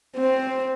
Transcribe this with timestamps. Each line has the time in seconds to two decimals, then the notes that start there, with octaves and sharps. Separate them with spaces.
0.17 C4